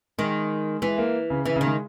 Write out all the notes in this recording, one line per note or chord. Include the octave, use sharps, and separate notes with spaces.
D#3 G#3
E3 G#3
A#3
C#3
C#3 E3
C#3
D#3
G#3